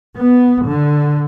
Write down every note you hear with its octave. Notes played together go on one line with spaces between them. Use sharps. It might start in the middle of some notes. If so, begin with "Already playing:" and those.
B3
D3